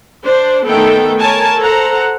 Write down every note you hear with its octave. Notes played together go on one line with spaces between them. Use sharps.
D4 C5
D#3 A3 B3 A4 G5
A#4 C#5 G#5 A5
A4 C5 F#5 A#5